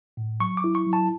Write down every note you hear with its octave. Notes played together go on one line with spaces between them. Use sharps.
A2
F#3 C#6
D6
E4
C#6
F#3
A5